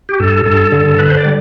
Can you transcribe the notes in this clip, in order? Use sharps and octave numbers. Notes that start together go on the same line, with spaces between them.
G4
G2 A4
G2 A4
D3
D3 B4
C5
D5
G3